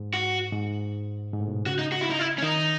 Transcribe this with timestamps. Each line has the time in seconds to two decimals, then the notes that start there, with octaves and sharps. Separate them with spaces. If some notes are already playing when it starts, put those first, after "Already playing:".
Already playing: G#2
0.14 F#4
0.52 G#2
1.33 G#2
1.40 A2
1.47 B2
1.66 C#3 F#4
1.79 D#4
1.92 F#4
2.01 E4
2.10 D#4
2.19 E4
2.38 C#4
2.42 D#3 D#4